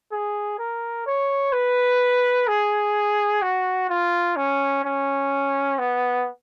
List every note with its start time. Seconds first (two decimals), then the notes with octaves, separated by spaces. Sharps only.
0.12 G#4
0.59 A#4
1.06 C#5
1.53 B4
2.48 G#4
3.42 F#4
3.89 F4
4.36 C#4
4.84 C#4
5.79 B3